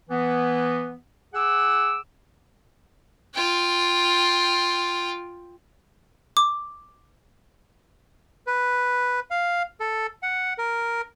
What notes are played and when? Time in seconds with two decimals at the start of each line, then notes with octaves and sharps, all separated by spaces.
0.10 E3 B3
1.34 G#4 F#5 D6 E6
3.35 F4 G5
6.37 D6
8.47 B4
9.31 F5
9.80 A4
10.23 F#5
10.58 A#4